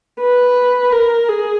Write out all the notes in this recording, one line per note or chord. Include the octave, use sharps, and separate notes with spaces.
B4
A#4
G#4